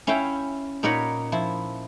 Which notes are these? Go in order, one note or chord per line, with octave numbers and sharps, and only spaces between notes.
C#4 E4 E5 F5 G5
A#2 D#4 A#4 B4 C#5 F#5
F3 E4